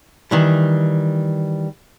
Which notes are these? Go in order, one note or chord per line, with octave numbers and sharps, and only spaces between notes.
D#3 E3 G3